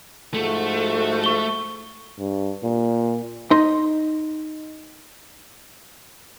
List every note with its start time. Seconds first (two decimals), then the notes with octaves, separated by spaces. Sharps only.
0.34 G#2 F3 A3 F#4
1.24 C#6 G7
2.19 G2
2.64 A#2
3.51 D#4 D#5 C6